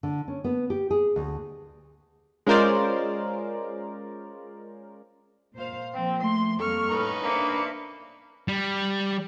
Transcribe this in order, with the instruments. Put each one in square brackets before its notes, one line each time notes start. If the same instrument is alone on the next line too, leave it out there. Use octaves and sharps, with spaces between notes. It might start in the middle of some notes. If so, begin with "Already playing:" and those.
[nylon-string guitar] D3
C#4
B3
G4
G#4
D2
[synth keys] G#3 C#4 F4 A#4 C5 D5
[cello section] A#2 C5 F5
[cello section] F3 A#3 [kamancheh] C4
[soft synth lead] A3 [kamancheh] C6
[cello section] F2 G3 A#3 [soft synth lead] A4 [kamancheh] C#6 F6
[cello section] A2 [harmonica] C#4 D#4 B4
[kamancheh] A#3 [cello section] D4 C5 E5 [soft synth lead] C#7
[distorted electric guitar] G3